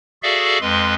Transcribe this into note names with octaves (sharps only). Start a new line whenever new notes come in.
F#4 G#4 A4 D5 E5 F5
F2 G#3 B4 C6